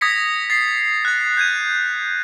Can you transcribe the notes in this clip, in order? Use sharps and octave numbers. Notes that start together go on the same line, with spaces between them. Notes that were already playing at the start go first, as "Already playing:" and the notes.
D#6 G#6 A#6 B6 C#7
A6 C7
F#6 A6
G6 G#6 D#7